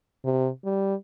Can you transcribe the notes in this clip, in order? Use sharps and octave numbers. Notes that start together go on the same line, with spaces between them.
C3
G3